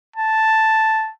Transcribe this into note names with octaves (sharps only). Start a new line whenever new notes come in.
A5